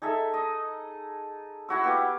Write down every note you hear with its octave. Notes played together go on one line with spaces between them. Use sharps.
D#4 G#4 A4 E5
D#5
E4 F#4 E6
B3 G4 F5